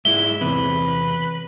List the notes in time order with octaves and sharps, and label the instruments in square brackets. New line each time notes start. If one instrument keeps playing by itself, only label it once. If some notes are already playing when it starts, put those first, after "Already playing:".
[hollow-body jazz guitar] G#2 G#3 E4 [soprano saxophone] E5 [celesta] G7
[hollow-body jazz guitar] E2 C3 [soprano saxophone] B4